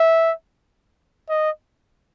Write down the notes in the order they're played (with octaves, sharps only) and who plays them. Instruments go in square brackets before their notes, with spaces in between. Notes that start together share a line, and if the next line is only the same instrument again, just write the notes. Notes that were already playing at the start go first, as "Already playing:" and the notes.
Already playing: [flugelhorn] E5
D#5